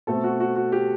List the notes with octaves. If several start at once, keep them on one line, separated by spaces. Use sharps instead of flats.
B2 A3 C4 A4
F#4
F#4
F#4
G4